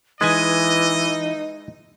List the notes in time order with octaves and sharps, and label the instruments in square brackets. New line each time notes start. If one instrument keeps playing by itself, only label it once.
[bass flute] E3 [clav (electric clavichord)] G#3 B4 G#5 [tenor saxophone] D#4 [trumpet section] D#5